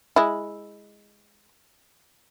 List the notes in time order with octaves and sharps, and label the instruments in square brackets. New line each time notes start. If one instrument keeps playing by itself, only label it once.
[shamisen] G#3 E4